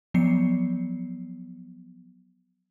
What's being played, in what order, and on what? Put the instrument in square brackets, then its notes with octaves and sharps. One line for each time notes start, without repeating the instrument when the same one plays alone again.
[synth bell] F3 F#3 B3 C7 C#7